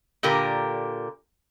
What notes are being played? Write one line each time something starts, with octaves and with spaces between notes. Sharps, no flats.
A#2 D3 G4 A#4